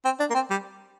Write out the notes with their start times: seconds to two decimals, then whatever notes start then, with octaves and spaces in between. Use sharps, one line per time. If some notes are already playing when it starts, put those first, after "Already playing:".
0.05 C4
0.20 D4
0.30 A#3
0.35 C4
0.50 G3